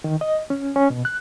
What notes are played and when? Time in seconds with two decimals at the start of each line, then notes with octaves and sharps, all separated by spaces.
0.04 D#3
0.21 D#5
0.50 C#4
0.76 C#4
0.90 B2
1.05 F#6